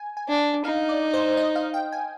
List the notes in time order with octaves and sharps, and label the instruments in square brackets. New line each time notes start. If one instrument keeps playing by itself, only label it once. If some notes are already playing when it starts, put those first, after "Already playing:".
Already playing: [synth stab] G#5
G#5
[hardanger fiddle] D4
[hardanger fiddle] D#4 [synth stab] F5
[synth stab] D5
C5
D#5
F5
G5
G#5